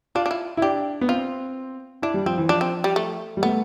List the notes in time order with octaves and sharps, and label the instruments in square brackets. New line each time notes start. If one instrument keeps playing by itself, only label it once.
[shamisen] D4 [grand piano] F4
[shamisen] D4
E4
[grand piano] E4
[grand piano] D4 [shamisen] G4
[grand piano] B3
[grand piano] C4 [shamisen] F4
[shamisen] D4 [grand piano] E4
[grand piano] G3
[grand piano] F3 [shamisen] C4
[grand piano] E3
[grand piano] F3 [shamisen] D4
[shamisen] C4
G3
A3
[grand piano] G3
[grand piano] A3 [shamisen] B3